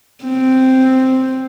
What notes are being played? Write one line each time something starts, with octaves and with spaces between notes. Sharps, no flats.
C4